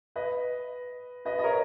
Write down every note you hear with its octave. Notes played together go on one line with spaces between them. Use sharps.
B4 D#5
B4 D#5
D#5
A#4 C#5